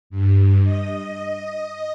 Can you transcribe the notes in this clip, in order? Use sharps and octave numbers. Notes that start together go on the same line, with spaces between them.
G2
D#5